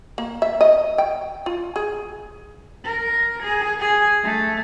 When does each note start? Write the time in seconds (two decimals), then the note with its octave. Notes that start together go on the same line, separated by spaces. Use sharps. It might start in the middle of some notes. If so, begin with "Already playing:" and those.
0.18 A#3
0.42 E5
0.61 D#5
0.98 G5
1.46 F4
1.76 G#4
2.85 A#4
3.43 G#4
3.80 G#4
4.24 A3